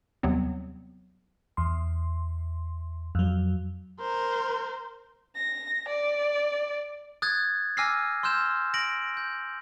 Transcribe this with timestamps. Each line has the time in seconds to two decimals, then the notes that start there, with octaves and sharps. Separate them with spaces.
0.23 D#2 C3 F#3 G3 B3 C4
1.57 E2 C6
3.15 F2 F#3
4.01 A#4 C5
5.36 A#6
5.89 D5
7.22 D#6 F#6 G#6 A6
7.77 G#5 D6 E6 F6 A#6 C7
8.23 C6 E6 F6 G6 E7
8.74 A#6 D7 F#7
9.17 G6